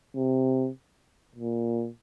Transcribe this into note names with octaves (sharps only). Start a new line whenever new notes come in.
C3
A#2